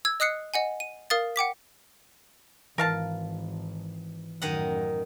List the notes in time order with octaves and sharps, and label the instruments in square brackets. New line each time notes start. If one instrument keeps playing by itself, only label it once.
[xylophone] E6 G#6
D#5 D#6 F#6 C7 C#7
D#5 F#5 G#5
D#7
A#4 F5 D#6 A6
F#5 G5 D6 B6
[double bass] G#1 [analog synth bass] E3 [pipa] A#4 F5 A5
[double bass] A1 F#2 [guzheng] D#3 D#5 F#5